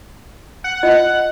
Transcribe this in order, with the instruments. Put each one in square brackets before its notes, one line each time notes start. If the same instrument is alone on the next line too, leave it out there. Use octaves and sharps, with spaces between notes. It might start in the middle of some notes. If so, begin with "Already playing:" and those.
[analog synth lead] F#5
[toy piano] F4 D#5